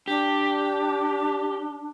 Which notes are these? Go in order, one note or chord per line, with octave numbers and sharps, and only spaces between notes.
D4 G4